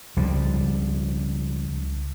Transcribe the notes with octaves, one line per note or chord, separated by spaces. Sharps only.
C#2 F3 G3